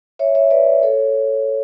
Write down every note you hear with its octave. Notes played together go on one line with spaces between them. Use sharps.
C#5 E5
C#5 E5
B4 D5
A4 C#5